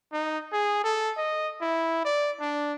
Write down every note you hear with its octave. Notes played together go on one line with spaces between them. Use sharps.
D#4
G#4
A4
D#5
E4
D5
D4